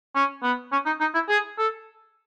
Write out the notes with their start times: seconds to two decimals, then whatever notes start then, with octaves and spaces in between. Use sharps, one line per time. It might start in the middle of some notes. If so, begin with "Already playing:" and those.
0.15 C#4
0.43 B3
0.72 C#4
0.86 D#4
1.00 D#4
1.14 E4
1.29 G#4
1.58 A4